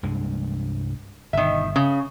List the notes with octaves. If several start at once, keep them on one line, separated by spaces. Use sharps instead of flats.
C2 G2 G#3
G1 B2 D#3 E5
C#3 C#4